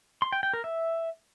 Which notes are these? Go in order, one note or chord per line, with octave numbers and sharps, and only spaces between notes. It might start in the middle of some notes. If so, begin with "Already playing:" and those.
C6
G5
G5
A#4
E5